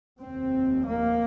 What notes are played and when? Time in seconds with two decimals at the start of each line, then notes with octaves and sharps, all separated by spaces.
0.19 F1 D#2 C4
0.87 A#3